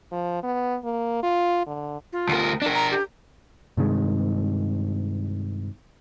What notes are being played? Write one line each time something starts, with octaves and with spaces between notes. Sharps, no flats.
F3
B3
A#3
F4
D3
F4
D2 A#4
D4 A#4
A#5
G4
G2 C3 D#3 G#3